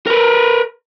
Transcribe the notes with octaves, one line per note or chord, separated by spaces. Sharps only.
A#4 B4